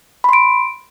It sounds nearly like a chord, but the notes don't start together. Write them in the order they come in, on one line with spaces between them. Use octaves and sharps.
B5 C6 D7